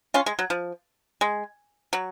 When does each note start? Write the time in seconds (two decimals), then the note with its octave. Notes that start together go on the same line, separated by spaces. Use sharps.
0.14 C#4 F4
0.26 G#3
0.39 F#3
0.50 F3
1.21 G#3
1.93 F#3